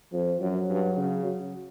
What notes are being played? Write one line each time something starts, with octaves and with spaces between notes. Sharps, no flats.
F2 F3
F#2 F#3
G2
C#3
F#3